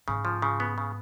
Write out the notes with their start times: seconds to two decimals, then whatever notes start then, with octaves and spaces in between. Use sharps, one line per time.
0.08 G#2 C#3
0.25 F3
0.42 C#3
0.60 B3
0.78 C#3